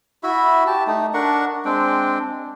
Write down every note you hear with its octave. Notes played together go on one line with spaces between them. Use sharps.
E4 F#4 E5 B5
G4 A5
A3 D#4
D4 A#4 F#5 C#6
G#3 C4 D4 G5